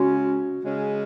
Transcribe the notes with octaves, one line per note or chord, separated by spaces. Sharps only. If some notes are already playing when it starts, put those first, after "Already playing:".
Already playing: C#3 G#3 C#4 F#4
C#3 G#3 C#4